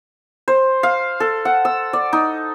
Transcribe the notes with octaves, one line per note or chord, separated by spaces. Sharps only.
C5
F5
A4
F#5
E6
D5
D#4